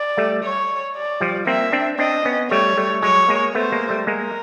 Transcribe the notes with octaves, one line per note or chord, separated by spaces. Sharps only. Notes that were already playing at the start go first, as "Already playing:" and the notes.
Already playing: D5
G3 A3
C#5
D5
F3 G3
A#3 C4 E5
C4 D4
C4 D4 D#5
B3 C#4
G3 A3 C#5
G3 A3
F#3 G#3 C#5
G#3 A#3
A3 B3 C5
G#3 A#3
G3 A3
G#3 A#3 A#4